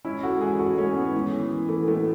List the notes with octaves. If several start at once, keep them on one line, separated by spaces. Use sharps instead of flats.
G#2 C#4 E4
G#2 F#4 A4
E3 E4 G#4
G#2 F#4 A4
G#2 A3 C#4
G#2 B3
E3
E3
E3
E3 A3
A2 A3